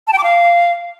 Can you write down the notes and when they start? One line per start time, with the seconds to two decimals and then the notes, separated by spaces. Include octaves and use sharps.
0.07 A5
0.13 G5
0.18 D6
0.24 F5